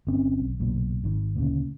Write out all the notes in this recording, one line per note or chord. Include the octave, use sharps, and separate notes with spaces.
G1 C4 C#4
B1
F#1 B1 A#2
G#1 D#3
D2 A#2 C#3